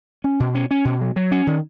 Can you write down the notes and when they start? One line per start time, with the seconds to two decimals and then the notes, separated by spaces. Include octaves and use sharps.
0.24 C#4
0.40 B2
0.55 C#4
0.71 C#4
0.85 B2
1.01 F#3
1.16 F#3
1.32 C#4
1.47 D#3